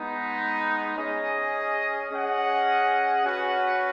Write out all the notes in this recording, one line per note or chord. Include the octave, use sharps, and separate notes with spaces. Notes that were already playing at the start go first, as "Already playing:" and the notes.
Already playing: G#3 B3 D#4
C#4 G#4 D#5
C#4 G#4 D#5 F#5
C#4 F#4 B4 F#5